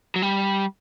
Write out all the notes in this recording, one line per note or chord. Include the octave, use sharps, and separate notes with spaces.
F#3
G3